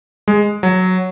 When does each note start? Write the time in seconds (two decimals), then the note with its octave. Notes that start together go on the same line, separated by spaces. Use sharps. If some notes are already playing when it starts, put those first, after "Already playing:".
0.28 G#3
0.63 F#3